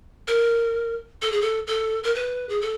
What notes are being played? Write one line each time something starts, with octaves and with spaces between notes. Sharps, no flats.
A#4
A4
G#4
A4
A4
A#4
B4
G#4
A4